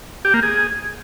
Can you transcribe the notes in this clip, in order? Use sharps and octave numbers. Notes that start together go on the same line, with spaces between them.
G4
A#3
G#4